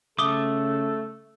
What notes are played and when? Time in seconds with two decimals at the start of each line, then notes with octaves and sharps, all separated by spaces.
0.19 C#3 A3 A4 D6 D#6 G7